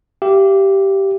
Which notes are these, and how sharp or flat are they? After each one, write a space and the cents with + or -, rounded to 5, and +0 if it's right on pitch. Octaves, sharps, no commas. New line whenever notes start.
G4 -10 F5 -45